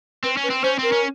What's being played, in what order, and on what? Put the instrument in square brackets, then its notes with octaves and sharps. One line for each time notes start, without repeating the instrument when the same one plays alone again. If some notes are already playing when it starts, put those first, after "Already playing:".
[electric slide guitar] C4 [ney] B4
[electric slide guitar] C#4
[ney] B4
[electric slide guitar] C4
[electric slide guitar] C#4 [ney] C5
[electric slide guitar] C4 [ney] A#4
[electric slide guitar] C#4